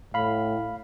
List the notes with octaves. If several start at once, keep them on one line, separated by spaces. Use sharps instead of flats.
A2 F5 B5